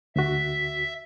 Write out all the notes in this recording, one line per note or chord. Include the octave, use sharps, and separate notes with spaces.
D2 F#4 E5